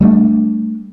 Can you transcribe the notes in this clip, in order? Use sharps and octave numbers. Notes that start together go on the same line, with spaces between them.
G3 A3 B3 D4